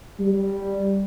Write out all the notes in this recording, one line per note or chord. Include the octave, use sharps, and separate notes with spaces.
G3